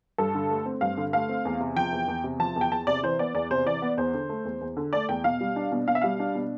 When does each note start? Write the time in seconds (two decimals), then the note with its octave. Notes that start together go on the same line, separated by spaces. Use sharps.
0.18 G2 A4
0.35 D3
0.50 A3
0.66 C4
0.81 G2 F5
0.97 D3
1.13 A3 F5
1.29 C4
1.45 E2
1.60 C3
1.76 F3 G5
1.92 E2
2.08 E2
2.24 C3
2.40 F3 A5
2.56 E2
2.61 G5
2.71 E2 A5
2.87 C3 D5
3.03 E3 C5
3.19 B3 D5
3.35 E2 D5
3.51 C3 C5
3.66 E3 D5
3.82 B3
3.98 E2 C5
4.14 D3
4.29 A3
4.45 E2
4.61 E2
4.77 D3
4.93 A3 D5
5.09 E2 G5
5.24 B2 F5
5.41 G3
5.56 D4
5.72 B2
5.88 B2 F5
5.95 E5
6.02 G3 F5
6.20 D4
6.35 B2